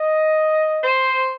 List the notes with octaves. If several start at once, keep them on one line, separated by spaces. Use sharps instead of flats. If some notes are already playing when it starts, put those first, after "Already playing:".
Already playing: D#5
C5